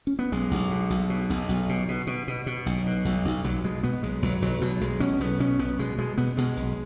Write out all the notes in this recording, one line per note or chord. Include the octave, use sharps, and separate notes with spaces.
C#4
B3
B1 G#3
B1
B2
B1
B2
B1
B1
B2
B2
B2
B2
B2
B1
B2
B1
B1
B1 F#3
B2 G#3
B2 B3
B1 G#3
B1 F#3
B1 F#3
B2 F#3
B1 G#3
B2 C#4
B1 B3
B2 C#4
B1 B3
B2 G#3
B2 G#3
B2 B3
B2 G#3
B1